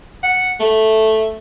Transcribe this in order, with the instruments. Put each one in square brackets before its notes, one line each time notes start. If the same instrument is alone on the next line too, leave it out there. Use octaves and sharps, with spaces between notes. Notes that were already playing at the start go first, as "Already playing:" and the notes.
[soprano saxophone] F#5
A3